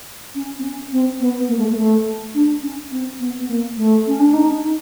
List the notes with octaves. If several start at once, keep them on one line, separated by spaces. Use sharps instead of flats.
C#4
C4
C#4
C4
B3
A#3
A3
A#3
A3
D4
C#4
C4
B3
B3
A#3
A3
C#4
D4
D#4
D#4